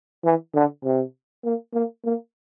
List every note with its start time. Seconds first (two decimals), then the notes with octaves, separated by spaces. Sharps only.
0.25 E3
0.55 D3
0.84 C3
1.45 A#3
1.74 A#3
2.05 A#3